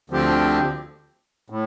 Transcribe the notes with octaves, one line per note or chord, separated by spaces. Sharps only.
D2 D3 F3 C4 G4
A2